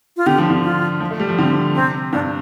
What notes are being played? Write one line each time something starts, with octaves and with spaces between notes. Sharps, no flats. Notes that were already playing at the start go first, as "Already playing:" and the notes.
F4
D3 G4
F3
D3
F4
F3
A3
G3
F3
D3 C4
C3 C4
G2 D4